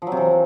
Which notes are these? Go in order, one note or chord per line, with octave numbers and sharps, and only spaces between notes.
F3
F#3
C3
E3